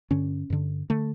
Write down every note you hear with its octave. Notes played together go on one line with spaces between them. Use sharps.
G2 D3 C#4
G2 D3
D3 A3